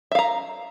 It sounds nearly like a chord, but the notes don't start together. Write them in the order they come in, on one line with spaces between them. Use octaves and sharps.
E5 F5 A#5